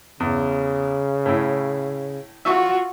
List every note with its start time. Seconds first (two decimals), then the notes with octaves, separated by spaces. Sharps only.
0.20 E2 C#3
1.26 A2 E4
2.45 F4 F#4 E5 C#6 E6